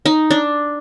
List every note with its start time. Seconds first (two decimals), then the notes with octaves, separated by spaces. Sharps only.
0.05 D#4
0.31 D4